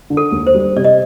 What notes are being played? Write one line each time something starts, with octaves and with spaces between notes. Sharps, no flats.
D3
A4
D#2
C5
G3
C3 D5
D#5